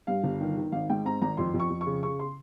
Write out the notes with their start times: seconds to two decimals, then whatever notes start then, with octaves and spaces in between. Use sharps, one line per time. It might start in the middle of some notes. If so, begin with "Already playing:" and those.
0.07 G2 F5
0.24 G1
0.41 D#3
0.57 D#3
0.72 G#1 F5
0.90 G#2 G5
1.05 C4 A#5
1.22 G#1 A#5
1.37 F2 C6
1.54 F2
1.60 C#6
1.70 F2
1.81 C#6
1.86 C#3
2.03 C#3 C#6
2.19 C6